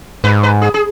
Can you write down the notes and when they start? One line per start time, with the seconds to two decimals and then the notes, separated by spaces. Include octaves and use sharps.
0.24 G#2 B4
0.43 B4
0.62 G#4
0.74 G#4